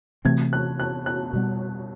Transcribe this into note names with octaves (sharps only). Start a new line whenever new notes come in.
C3 E3 A3 C4 G#6
F#6
F#6
F#6
B2 G3 B3